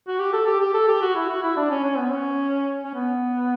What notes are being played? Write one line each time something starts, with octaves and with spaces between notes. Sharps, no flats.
F#4
G4
A4
G4
G4
A4
G4
F#4
E4
F#4
E4
D4
C#4
C#4
B3
C#4
C#4
B3